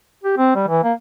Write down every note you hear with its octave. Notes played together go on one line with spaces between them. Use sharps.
G4
C4
G3
E3
A#3